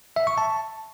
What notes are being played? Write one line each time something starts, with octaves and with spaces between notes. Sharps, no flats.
E5
C#6
A5